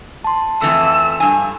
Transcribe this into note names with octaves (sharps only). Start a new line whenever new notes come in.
A5 C6
F2 E3 A3 E6
G2 G#5